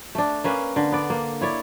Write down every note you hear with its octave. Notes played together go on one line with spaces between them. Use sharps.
A3 D4
A#3 C#4 B4
D3
B3 D5
A#3
E4 C#5 D5